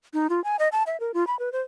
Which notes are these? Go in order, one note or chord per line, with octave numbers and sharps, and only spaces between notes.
D#4
F4
G#5
D#5
A5
E5
A#4
F4
B5
B4
C5